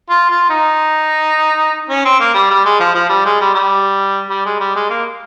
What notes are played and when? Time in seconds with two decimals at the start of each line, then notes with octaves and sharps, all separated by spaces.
0.10 F4
0.30 F4
0.50 D#4
1.90 C#4
2.05 C4
2.20 A#3
2.34 G3
2.51 G3
2.65 G#3
2.80 F3
2.95 F3
3.09 G3
3.26 G#3
3.41 G3
3.55 G3
4.30 G3
4.46 G#3
4.60 G3
4.76 G#3
4.90 A#3